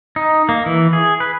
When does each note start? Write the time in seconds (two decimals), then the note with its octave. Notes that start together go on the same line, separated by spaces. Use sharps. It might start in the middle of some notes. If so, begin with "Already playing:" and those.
0.16 D#4
0.49 A#3
0.66 E3
0.93 G#4
1.20 B4